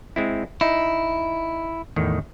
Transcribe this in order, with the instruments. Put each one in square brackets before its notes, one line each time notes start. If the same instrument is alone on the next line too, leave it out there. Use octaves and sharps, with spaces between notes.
[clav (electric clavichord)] G#3 C4 E4
[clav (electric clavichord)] D#4 [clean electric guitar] E4
[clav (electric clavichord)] E2 A2 D#3